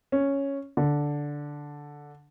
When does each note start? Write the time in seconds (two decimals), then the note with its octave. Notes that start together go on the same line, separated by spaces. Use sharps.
0.12 C#4
0.77 D3